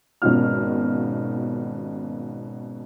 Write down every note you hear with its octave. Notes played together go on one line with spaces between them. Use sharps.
G#1 B2 D#3 C#4 F4 F6